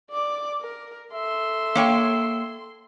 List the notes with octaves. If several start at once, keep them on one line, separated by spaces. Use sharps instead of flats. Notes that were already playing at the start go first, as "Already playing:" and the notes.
D5 D6
A#4
A4 E5 C6
A#3 C#5 G5